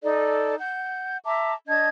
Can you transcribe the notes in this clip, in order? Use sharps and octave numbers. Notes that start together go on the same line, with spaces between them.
D#4 A4 D5
F#5 G6
E5 A5 A#5 D6
D4 D#5 A5 G#6